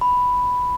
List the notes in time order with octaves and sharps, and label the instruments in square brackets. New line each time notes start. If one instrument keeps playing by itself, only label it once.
[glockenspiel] B5